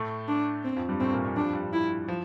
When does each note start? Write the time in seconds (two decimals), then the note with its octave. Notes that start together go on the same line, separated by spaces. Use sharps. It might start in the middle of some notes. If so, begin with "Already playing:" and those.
Already playing: A2 A3
0.28 D4
0.64 C4
0.76 F2 F3
0.89 G2 G3
1.00 A2 A3 C4
1.12 A#2 A#3
1.24 A#2 A#3
1.36 G3 D4
1.45 F3
1.53 G2 G3
1.73 E4
2.08 F3